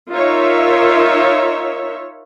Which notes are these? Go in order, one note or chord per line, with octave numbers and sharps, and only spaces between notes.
D#4 F4 A#4 C#5 E5